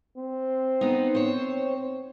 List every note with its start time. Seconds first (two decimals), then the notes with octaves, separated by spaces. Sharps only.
0.18 C4
0.81 B3 D#4
1.15 C5 C#5